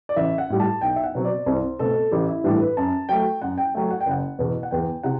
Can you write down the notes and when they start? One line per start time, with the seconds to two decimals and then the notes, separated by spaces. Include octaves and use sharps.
0.09 D5
0.16 A1 E5
0.38 F#5
0.50 A2 G3
0.60 A5
0.81 B1 G5
0.96 E5
1.04 F#5
1.15 B2 F#3 C4
1.25 D5
1.46 C2 C5
1.79 B2 A3 C4 A4
2.11 A1 G4
2.29 E4
2.44 A2 E3 G3 D4
2.61 B4
2.77 F#2 A5
3.09 F#3 A3 G5
3.42 F#2 F#5
3.58 G5
3.74 F#3 A3 G5
3.91 F#5
4.01 G5
4.06 F#1 F#5
4.39 E2 B2
4.63 F#5
4.71 E2 G5
5.03 C3 F#5